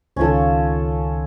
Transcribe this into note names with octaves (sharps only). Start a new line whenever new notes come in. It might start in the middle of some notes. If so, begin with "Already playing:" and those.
C#2 D#3 C#4 F4 A4